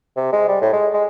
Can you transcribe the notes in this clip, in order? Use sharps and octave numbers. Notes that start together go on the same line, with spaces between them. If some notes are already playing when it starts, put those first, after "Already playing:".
C3
G#3
G3
A2
G#3
G#3